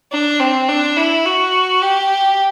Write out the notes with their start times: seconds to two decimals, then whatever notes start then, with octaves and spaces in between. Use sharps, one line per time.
0.12 D4
0.40 C4
0.68 D4
0.97 E4
1.25 F#4
1.82 G4